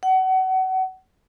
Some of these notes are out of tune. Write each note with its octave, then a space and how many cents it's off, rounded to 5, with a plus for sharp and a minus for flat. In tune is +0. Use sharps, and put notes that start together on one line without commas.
F#5 +30